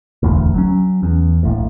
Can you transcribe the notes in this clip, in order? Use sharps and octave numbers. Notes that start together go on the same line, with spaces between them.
E1 A1 D2
F#3 C#4
E2
D1 A#1 A2